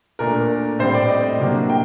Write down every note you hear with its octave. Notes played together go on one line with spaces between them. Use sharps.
A#2 A3 D4 A#4
A2 G3 C4 C5
D5
D#5
C3 F#3 A#3 D4
G5